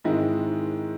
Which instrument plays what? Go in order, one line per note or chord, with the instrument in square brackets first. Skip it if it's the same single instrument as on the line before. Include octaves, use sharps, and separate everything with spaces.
[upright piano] G#2 D#3 G#3 C4 E4